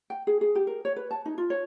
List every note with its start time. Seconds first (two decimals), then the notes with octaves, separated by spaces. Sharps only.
0.10 G5
0.27 G#4
0.41 G#4
0.55 G4
0.67 A#4
0.85 C#5
0.96 B4
1.11 A5
1.26 D#4
1.38 F4
1.50 C#5